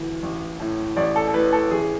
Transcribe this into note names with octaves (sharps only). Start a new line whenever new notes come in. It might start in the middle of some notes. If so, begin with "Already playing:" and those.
Already playing: D2 E3
A1
A2
A1 D5
A4
A4
A2 B4
A4
A1 G#4